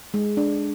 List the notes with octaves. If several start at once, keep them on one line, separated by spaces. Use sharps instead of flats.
G#3
D4